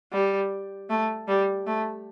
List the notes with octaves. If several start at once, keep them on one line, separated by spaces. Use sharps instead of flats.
G3
A3
G3
A3